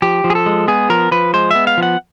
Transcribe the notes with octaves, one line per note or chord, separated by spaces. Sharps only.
F3 G4
F3
G#4
A4
G#3
B3 G#4
F3 A#4
F3 B4
G#3 C5
B3 E5
F5
F3
F#5